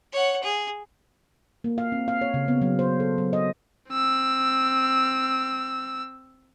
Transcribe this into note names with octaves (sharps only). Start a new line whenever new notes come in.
C#5 F#5
G#4
A#3
F5
C4
F5
C#5
C#3
B3
F#3
C5
A4
F#3
D#5
C4 E6